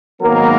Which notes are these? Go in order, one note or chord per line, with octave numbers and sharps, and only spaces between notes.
G#2 D#3 F#3 A#3 B3 A#4